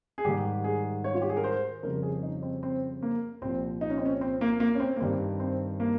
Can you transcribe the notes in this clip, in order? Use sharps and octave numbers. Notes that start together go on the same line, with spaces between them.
G#4
G#2 D#3 G3 G4
G#4
C#5
F4
G4
G#4
A#4
C5
F2 C#3 G3 A#4
G#4
D#4
C4
C4
A#3
C2 A#2 F3 C4
D#4
C#4
C4
C#4
C4
A#3
A#3
C#4
C4
A#3
G2 D#3 G3 C4
C4
A#3